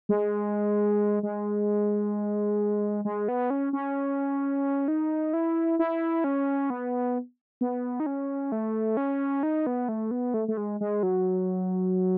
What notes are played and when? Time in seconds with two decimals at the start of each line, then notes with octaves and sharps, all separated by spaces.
0.09 G#3
1.23 G#3
3.05 G#3
3.28 B3
3.50 C#4
3.73 C#4
4.88 D#4
5.33 E4
5.79 E4
6.24 C#4
6.70 B3
7.61 B3
8.00 D#4
8.06 C#4
8.52 A3
8.97 C#4
9.43 D#4
9.67 B3
9.89 A3
10.11 B3
10.34 A3
10.48 A3
10.57 G#3
10.81 G#3
11.03 F#3